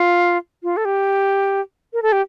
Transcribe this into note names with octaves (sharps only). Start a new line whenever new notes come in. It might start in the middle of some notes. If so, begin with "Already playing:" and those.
Already playing: F4
F4
A4
G4
A#4
A4
G4